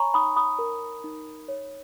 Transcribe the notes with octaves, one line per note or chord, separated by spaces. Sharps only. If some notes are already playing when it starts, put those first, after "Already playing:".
Already playing: C#5 G#5 A#5 B5 C#6
D#4 B5 D#6
B5 D#6
A#4
D#4
C#5